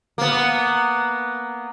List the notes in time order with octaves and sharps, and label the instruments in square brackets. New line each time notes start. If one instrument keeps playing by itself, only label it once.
[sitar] A#3 B3